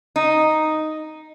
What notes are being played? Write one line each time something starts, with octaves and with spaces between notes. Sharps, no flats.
D#4